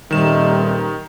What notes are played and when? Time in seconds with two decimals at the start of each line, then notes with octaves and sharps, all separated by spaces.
0.11 D#1 D#3 G3 A3 C4 D#4 E7